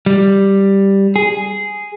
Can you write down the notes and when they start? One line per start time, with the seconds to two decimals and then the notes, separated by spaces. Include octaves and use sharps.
0.06 G3
1.16 G#4